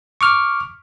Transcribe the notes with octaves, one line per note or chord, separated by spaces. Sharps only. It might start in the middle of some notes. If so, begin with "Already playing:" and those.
C#6 D6 F6